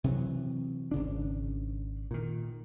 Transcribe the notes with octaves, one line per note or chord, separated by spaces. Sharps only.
C3 E3 F#3
G#1 C#3 D4
A#2 D#3